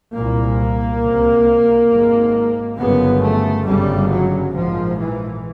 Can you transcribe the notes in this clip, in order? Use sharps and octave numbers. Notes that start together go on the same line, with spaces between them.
C2 A#2 A#3
C#2 C3
G#1
G#2
G1 F#2 C#3 B3
A3
G1 F#2 C#3 G3
F#3
A#1 G#2 F3
E3